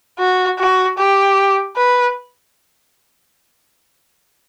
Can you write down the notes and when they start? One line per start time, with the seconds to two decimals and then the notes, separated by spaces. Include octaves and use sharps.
0.19 F#4
0.58 F#4
0.97 G4
1.76 B4